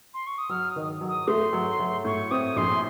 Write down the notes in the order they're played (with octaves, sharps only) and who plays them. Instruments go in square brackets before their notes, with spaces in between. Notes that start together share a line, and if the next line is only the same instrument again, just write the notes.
[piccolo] C6
C#6
D#6
[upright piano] F#3 [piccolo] F6
[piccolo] D#6
[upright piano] D#3
F#3
[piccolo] D#6
[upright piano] A3 [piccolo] C6
[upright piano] F#3
F#3
[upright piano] A2 [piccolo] C#6
[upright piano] C4 [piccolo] D#6
[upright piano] A#1 [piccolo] C6